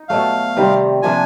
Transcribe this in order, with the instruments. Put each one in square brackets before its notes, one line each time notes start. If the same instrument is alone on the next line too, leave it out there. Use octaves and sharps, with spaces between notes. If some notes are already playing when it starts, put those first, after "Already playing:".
Already playing: [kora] D#4
[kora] B2 F#3 A3 [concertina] F5
[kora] C3 D#3 G3 C4
[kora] C3 F3 A#3 D4 [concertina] G#5